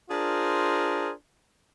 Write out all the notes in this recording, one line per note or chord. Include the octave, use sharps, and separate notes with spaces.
D4 F4 G#4 A#4 C5